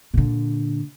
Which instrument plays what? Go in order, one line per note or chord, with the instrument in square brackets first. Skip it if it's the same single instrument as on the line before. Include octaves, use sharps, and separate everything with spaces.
[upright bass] A#2 D3